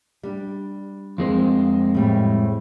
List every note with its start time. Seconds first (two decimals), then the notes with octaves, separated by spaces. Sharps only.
0.23 G3 D4
1.18 F2 G#3 C4
1.94 A2 G3 A3